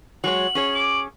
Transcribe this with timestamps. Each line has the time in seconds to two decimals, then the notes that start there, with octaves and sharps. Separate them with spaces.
0.24 F#3 G#3 C#5 F#7
0.55 C#4 G#4 C#5
0.74 D6